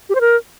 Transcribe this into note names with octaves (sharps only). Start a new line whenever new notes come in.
G4
C5
A#4